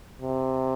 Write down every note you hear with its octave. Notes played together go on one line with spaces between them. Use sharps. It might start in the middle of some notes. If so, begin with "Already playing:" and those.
C3